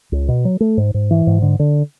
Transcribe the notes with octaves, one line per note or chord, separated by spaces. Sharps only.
C#2
B2
F#3
A3
G#2
G#2
E3
G#2
D3
D3